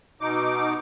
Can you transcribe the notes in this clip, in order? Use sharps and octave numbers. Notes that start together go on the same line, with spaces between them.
B2 D#4 D6